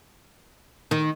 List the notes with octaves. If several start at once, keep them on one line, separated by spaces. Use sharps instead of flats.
D#3